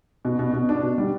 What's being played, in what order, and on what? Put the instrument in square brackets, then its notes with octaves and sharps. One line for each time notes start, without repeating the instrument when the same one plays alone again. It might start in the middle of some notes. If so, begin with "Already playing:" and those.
[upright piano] B2
B2
B2
D4
B2
G3